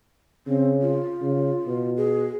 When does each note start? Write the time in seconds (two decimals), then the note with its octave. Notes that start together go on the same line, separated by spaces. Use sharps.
0.47 C#3 C4
0.82 F4
1.21 C#3
1.67 B2
1.97 G#4